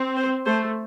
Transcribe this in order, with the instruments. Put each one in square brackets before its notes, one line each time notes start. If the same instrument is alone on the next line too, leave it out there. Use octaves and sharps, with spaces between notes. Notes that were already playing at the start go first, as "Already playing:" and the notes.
Already playing: [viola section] C4
[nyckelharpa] C5
[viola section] A3 [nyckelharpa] C5